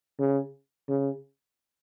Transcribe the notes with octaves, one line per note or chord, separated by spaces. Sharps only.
C#3
C#3